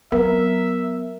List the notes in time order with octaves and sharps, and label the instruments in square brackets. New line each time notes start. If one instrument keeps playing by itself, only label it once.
[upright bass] F#3 C4 [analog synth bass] B3 [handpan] A#4 [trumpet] E5